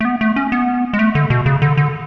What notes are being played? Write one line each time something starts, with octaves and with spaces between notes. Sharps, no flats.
A3
B3
A3
C#4
B3
G#3
A3
D3
B2
C#3
D3
D3